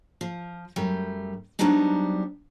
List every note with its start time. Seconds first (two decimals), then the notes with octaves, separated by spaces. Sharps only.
0.21 F3
0.76 F#2 G3 A3
1.59 F#3 G3 B3 C4 D4 D#4